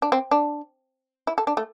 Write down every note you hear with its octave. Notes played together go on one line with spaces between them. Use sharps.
D4
C4
D4
E4
A4
D4
A3